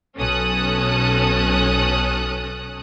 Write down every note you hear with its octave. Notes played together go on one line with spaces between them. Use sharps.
B1 C#4 A4 D#6 F#6